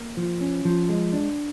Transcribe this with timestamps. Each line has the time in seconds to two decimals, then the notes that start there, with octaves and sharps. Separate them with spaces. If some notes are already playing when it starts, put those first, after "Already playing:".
Already playing: A#3
0.17 F3
0.41 C#4
0.65 F3
0.89 G#3
1.13 D4